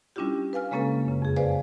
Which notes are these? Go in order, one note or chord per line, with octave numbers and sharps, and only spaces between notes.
G3 C#4 D4 E4 F4 G4
B4 F5 G#5 F6
C#3 G#3 A#3 C#4 A4 B4
F#2 C#3
F2 G#4
G#4 B4 C5 D5 F5 G#5